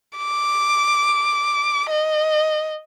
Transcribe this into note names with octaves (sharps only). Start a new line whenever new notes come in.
D6
D#5